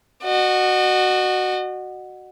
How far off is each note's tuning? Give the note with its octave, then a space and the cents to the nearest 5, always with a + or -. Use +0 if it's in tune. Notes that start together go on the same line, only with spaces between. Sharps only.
F#4 +0 D#5 -40